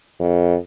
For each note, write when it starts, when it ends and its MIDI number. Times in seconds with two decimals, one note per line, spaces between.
0.20 0.55 41